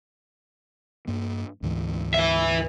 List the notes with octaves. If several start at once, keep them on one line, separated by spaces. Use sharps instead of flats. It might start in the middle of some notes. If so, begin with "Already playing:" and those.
G2 A#3
D2 G#2 E3
B4 E5